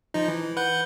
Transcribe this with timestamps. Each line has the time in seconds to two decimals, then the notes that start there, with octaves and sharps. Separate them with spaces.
0.14 F3 D#4
0.28 E3
0.57 B4 F#5 G6